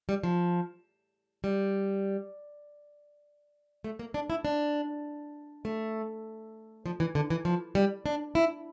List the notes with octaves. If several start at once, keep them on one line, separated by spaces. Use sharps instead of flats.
G3
F3
G3
A3
A#3
D4
E4
D4
A3
F3
E3
D3
E3
F3
G3
D4
E4